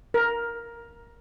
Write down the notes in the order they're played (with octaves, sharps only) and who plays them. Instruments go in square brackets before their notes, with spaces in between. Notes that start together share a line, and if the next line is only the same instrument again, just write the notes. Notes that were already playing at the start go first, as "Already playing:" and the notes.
[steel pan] A#4